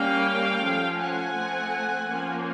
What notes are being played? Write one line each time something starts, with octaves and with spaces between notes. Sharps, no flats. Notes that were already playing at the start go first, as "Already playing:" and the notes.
Already playing: G3 A#3 C#4 F5 G5
F3 A3 C#4
F#5 G#5
F3 A3 C4
F3 A#3 C#4